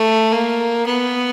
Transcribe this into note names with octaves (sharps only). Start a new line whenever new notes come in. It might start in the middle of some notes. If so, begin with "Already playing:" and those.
Already playing: A3
A#3
B3